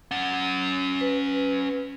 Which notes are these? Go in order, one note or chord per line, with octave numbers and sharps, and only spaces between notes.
C#4 F#5
B4